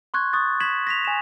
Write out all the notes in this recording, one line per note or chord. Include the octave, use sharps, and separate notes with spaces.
C6 C#6 F#6 G#6
C#6 D#6 F#6 A6
G#6 B6 E7 F#7
A#6 B6 F7
G#5 E7